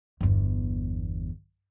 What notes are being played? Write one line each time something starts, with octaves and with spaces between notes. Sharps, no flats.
G1 E2